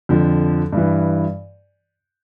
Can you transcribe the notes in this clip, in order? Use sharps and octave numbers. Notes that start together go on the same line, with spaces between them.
F2 D3 F3
G2 E3